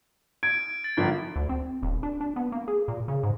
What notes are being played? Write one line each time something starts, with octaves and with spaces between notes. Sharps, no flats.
G#6 D7
A6
G1 F3
D2
C4
D#1
D4
D4
B3
A#3
G#4
A#2
C#3
G#2